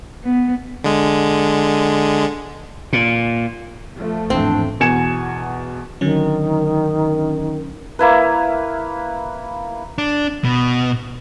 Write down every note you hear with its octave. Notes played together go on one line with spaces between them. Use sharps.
B3
D3 G#3
A#2
F3 A3
G#1 E2 A2 C4 D4
E2 B2 G#5 G#6 C#7 E7
D3 D#3 F#3 C#4
A#3 E4 B4
D4
B2